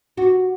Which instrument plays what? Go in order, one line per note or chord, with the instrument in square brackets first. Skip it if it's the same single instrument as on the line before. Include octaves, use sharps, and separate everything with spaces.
[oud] F#4